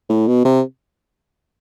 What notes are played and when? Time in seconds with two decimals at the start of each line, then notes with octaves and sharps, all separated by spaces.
0.09 A2
0.27 B2
0.45 C3